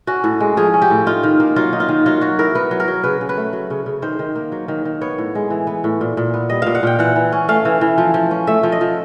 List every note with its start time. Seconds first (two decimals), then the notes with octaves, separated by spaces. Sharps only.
0.07 C#4 F#4
0.24 A2
0.40 G#3
0.57 F3 G#4
0.74 C#4
0.82 G4
0.90 A2
1.06 D#4 F4
1.23 D#3
1.40 A#3
1.56 F#3 F4
1.73 D#4
1.80 F4
1.89 D#3
2.06 F#3 F4
2.21 F#3 F#4
2.39 E4 A#4
2.55 B3 B4
2.71 F#3
2.80 A#4
2.88 F#3
3.04 C#3 B4
3.21 C#3
3.29 B4
3.37 A3
3.53 F#3
3.70 C#3
3.86 C#3
4.02 D#3 C5
4.19 D#3
4.36 A#3
4.52 F#3
4.68 D#3
4.85 D#3
5.01 B3 C#5
5.18 A2
5.35 G#3
5.50 E3
5.67 B3
5.84 A2
6.01 A#2
6.17 A#2
6.34 B3
6.50 G3 D#5
6.62 A#2 F5
6.75 F#5
6.83 A#2 G5
6.99 E3 F#5
7.16 E3
7.32 C#4
7.48 A3 F5
7.65 E3
7.81 E3
7.98 F3
8.14 F3
8.31 C#4
8.47 A3 E5
8.63 F3
8.72 D#5
8.81 F3